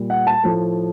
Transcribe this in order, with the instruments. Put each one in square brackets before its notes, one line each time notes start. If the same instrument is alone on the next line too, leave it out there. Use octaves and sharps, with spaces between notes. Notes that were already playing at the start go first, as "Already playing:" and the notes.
Already playing: [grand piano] A#2 G3
F#5
A5
A2 F3 A3